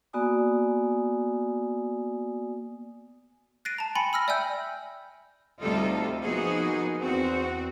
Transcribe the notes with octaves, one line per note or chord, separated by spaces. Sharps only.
A#3 B3 F#4 D5 G#5 D#6
F#6 A6 A#6 C7 D7 D#7
A5 A#5
G5 G#5 B5 C6 A6 C#7
B5 E6 F6 A#6
D5 E5 G5 G#5 E6 G6
D2 C3 G3 D#4 F4 A4
F3 A#3 B3 D#4 F#4 G#4
E2 C4 F#4